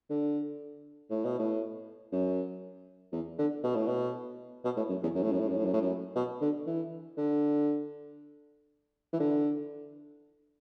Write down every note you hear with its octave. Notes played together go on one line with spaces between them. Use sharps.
D3
A2
B2
A2
F#2
E2
D3
B2
A2
B2
B2
A2
F#2
E2
F#2
A2
F#2
A2
F#2
A2
F#2
A2
F#2
B2
D3
E3
D3
E3
D3